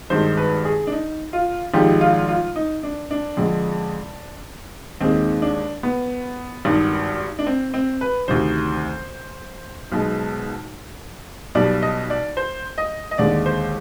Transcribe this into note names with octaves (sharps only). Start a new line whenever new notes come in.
G#1 G2 D#3 G#3 C5
B4
G#4
D4
D#4
F4
G#1 G#2 F3 G#3 G4
F4
F4
D#4
D4
D4
F2 D3 G#3
D#2 D#3 G#3 C4
D4
B3
G#1 G2 D#3
D4
C4
C4
B4
D2 C3 D#3 C5
B1 B2 G#3
B1 B2 G3 D5
D#5
D5
C5
D#5
D#5
D#2 D3 G#3 D5
C5